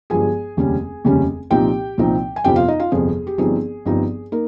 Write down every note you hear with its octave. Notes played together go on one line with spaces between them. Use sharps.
G1 G2 F3 G#3 G#4 G#5
F1 D#2 C#3 G3 C#4
F1 D#2 C#3 G3 C#4
C2 A#2 F3 C4 D#4 G4 G5
C2 A#2 F3 C4 D#4
G#5
G1 F2 C3 F3 G4 G5
F4 F5
D#4 D#5
F4 F5
G1 F2 C3 F3 G#4
G4
G1 G2 F3 C4 D#4 G#4
G1 G2 F3 C4 D#4
A#3 D#4 A#4